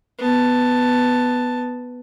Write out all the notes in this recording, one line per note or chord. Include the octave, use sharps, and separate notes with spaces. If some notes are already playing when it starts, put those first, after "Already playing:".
B3 A5